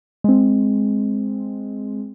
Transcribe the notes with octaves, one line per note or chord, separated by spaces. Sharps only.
G#3 C4